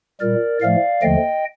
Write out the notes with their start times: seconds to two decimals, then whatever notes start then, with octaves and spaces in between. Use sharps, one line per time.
0.21 A#2 G3 A#4 D5
0.62 A2 F3 A3 D5 F5
1.02 D#2 D3 F3 A3 D#5 G5